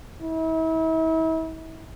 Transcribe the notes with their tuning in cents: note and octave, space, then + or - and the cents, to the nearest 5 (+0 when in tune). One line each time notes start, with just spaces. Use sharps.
E4 -40